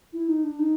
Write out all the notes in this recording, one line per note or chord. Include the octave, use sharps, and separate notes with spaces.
E4
D#4
D4
D#4